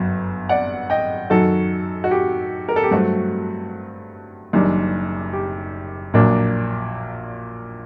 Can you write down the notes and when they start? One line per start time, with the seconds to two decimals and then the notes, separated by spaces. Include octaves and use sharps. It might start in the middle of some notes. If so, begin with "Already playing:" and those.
Already playing: G1 F#2 F#3
0.49 D5 F#5
0.90 D#5 G5
1.30 F#2 D#3 F#3 F#4 A4
2.04 F#4
2.11 G4
2.68 A#4
2.76 A4
2.83 G4
2.91 G2 F#3 A3 C4 F#4
4.53 F#1 F#2 D#3 G3 D4
5.33 G4
6.14 A#1 A#2 F#3 A#3 D4